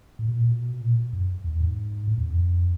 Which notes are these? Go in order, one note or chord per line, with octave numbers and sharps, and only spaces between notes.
A2
B2
A#2
B2
A#2
F#2
E2
G#2
A2
E2
F2